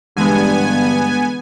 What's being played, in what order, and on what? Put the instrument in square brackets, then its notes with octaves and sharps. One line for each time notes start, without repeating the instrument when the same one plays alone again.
[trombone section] G2 [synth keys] D3 E3 G#3 [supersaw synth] B3 G#5